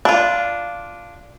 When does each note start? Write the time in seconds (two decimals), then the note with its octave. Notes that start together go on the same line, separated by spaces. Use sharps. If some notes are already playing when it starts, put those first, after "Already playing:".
0.05 D4 F4